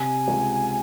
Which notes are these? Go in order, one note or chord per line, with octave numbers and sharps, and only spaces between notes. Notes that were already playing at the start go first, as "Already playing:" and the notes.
Already playing: C3 G#5
C#2